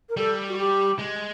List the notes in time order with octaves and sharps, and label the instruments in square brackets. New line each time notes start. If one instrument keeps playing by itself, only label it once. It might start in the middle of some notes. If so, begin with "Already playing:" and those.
[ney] A#4
[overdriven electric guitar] G3 [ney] A4
[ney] F#4
G4
[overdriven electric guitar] G#3